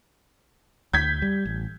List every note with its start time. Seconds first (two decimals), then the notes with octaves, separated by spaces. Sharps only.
0.93 D2 G6 G#6 B6
1.22 G3
1.45 A1